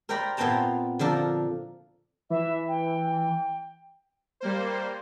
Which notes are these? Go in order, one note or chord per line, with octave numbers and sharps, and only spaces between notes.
A#4 C5 D5 G5 A#5 B5
A#2 B3 C4 G5 A5 A#5
D3 F3 D4 A#4
E3 E5
G5
G3 A#3 C5